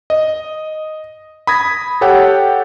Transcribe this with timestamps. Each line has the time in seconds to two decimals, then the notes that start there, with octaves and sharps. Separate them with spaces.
0.10 D#5
1.47 B5 D#6 G#6 A#6
2.01 G4 A4 C#5 F#5 G5